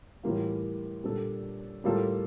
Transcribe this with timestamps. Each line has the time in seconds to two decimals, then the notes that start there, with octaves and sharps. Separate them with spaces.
0.23 A2 E3 G3 A#3 F4
1.03 A#2 G3 D4 A4
1.84 A2 G3 A#3 F4 A4